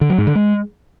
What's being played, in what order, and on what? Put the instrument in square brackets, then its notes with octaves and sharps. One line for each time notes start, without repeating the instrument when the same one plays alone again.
[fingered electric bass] D3
F#3
G#2
D3
G#3